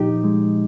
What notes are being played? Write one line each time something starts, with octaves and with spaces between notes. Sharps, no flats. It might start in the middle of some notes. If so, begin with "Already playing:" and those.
Already playing: A#2 F3 D#4 G4
G#3